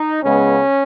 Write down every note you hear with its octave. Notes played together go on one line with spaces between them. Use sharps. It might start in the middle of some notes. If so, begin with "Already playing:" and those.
Already playing: D#4
C#2 C#3 G#3 B3 C#4